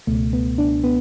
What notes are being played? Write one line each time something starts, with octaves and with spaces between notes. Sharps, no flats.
C#2 B2 A3
B3
D4
B3